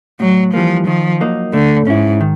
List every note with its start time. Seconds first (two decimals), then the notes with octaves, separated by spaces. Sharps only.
0.20 A2 F#3
0.54 E3 F3 G3 A#3
0.87 D#3 F3
1.21 F#3 A#3 D#4
1.53 D3 A3
1.87 G#2 C#4 E4
2.21 D#3